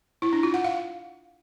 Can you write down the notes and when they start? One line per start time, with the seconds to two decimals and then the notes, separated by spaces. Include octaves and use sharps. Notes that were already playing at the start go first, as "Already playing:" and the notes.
0.22 E4
0.33 D4
0.43 F4
0.54 F#5
0.64 F5